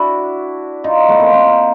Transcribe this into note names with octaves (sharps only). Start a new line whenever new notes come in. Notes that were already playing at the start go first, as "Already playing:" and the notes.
Already playing: D4 E4 F#4
D#4 F4
A3 B3
A#3 C4
A#3 C4